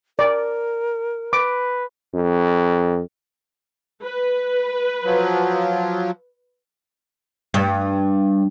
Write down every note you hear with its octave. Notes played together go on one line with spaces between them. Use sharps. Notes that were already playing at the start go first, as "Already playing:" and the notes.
A#4 D5
B4 D6
F2
B4
F3 F#3
G2